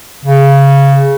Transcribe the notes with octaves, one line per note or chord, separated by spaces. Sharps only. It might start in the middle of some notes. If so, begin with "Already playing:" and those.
C#3